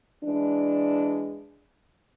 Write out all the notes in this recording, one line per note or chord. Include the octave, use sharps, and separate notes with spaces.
E3 G#3 D4